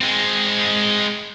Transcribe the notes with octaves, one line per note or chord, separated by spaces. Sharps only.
G#3 C4